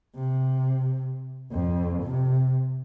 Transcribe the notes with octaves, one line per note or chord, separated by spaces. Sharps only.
C3
F2
C3